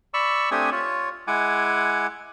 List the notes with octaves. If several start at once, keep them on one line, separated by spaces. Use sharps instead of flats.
D5 B5 C#6 E6
A3 C4 D4 G4 G#5 D#6
F4 C#5
G#3 E4 F#5 G#5 D6